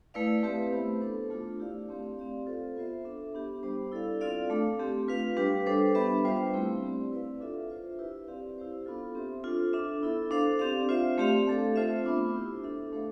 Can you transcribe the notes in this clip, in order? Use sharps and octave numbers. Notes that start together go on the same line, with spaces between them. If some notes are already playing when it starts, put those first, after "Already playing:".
A3 E4 B4 D5 F5
A3 C4 G4 B4 E5
B3 E4 G4 C5
B3 D4 A4 C5
A3 D4 F4
E4 G4 D5 F5
A3 C4 G4 D5 F5
C4 G4 D5 F5
F4 A4 C5
B3 F4 C5 E5
D4 A4 E5
B3 D4 G4
G3 B3 D4 G4 C5
E4 A4 D5 F5
C4 F4 A4 D5 F5
A3 D4 A4
A3 C4 G4
F4 B4 F5
G3 D4 G4 B4
G3 D4 A4 C5
B3 D4 G4 B4 E5
G3 D4 F4 C5 F5
A3 C4 E4 G4
C4 G4 D5
E4 B4 D5 F5
D4 F4 A4 E5
F4 C5 E5
E4 G4 B4
C4 G4 D5 F5
E4 G4 C5 F5
B3 D4 F4 A4
C4 G4 C5 E5
D4 F4 A4 C5
D4 A4 E5
B3 E4 A4
D4 A4 C5 F5
C4 G4 D5 F5
F4 C5 E5
A3 C4 G4 D5 F5
A3 D4 A4
A3 C4 F4 C5 E5
B3 D4 F4
E4 G4 C5
D4 A4 E5
A3 D4 A4 C5 F5